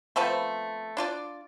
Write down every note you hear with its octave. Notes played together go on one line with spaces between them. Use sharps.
F3 A3 B3 C4
D4 F4 D5